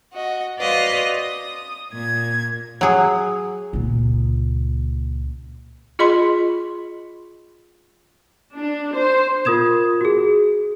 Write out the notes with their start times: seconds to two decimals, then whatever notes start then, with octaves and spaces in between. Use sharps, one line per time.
0.12 F#4 D#5
0.59 F#4 B4 C5 D5 D#5 F5
1.10 D#6
1.93 A#2 G#6
2.81 F#3 G#4
3.73 C#2 A#2
5.99 F4 G#4 D#5 B5 C6
8.55 D4
8.96 C5
9.45 F4 A#4 D#6 G#6 E7
10.01 F#4 G#4